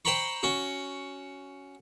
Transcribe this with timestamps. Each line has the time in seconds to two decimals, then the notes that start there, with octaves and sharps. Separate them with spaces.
0.05 C5 G5 A#5 B5 C#6
0.43 C#4 F#4